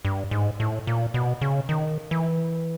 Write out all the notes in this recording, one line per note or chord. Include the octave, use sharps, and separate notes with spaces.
G2
G#2
A2
A#2
B2
C#3
D#3
E3